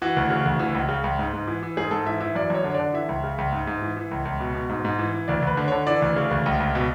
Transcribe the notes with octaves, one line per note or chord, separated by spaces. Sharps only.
E3 F#4
D2
C#3
D2
E3
C#2
C#3
C#2
G#2
G#2
E3
E3
G#2 G#4
G#2 A4
E3 E5
E3 E5
F#2 D5
F#2 C#5
D3
C#5
D5
D3
E3 E5
C#2
C#3
C#2
G#2
G#2
E3
E3
C#2
C#2
B2
B2
G#2
G#2
E3
E3
D2 D5
D2 B4
D3
D3 C#5
E3 D5
D2
C#3
D2
C#2
C#2
B2